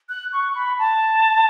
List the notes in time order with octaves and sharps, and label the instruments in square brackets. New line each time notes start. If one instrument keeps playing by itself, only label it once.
[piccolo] F#6
C#6
B5
A5